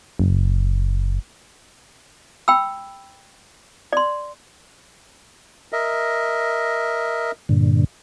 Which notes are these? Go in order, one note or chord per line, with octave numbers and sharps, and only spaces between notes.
F#1
G5 B5 E6
D5 C6
A#4 D#5 E5
G2 A#2 D3